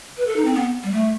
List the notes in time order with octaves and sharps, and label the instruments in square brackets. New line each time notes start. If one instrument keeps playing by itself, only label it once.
[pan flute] B4
A4
D#4
C4
B3
G3
A3